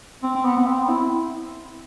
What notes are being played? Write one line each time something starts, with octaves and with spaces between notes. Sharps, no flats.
C4
C4
B3
B3
C4
E4